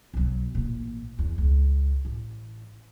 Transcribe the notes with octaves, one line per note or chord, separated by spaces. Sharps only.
B1 F#3
A1 A#2
E2
C#2
A1